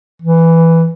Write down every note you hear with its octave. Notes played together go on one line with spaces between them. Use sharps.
E3